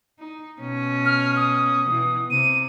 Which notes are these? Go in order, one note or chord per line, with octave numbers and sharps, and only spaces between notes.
D#4
B2 C#4
F6
D#6
B2 E3
C3 D#7